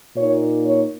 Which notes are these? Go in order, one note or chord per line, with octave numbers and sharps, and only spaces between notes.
A#2 A#3 D#4 C#5
C#5